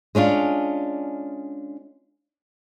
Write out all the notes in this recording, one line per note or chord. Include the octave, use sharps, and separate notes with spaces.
G#3 C#4 D4 F4